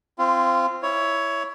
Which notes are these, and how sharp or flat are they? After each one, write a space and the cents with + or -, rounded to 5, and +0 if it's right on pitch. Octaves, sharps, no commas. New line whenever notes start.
C4 +0 F4 -20
E4 +0 C#5 +15